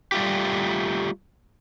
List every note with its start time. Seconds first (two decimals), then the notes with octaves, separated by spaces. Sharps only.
0.12 G3 A3 F4 G4